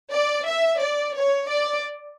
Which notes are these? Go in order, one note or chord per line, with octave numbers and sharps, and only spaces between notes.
D5
E5
D5
C#5
D5